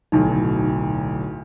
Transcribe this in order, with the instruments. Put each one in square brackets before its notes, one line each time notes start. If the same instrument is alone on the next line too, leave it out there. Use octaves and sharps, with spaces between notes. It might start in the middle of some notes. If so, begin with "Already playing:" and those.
[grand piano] D1 B1 [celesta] D#4